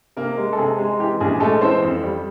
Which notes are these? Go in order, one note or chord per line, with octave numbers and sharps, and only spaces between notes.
C3 A#3 A#4
G#3
A4
C3 G#4
G#3
E3 G4
A#1 G#4
G#3 A3 A4
E3 C4 C5
F2
G3